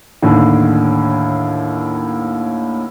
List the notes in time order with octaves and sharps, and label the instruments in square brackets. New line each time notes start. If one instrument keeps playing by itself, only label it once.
[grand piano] D#2 A2 D3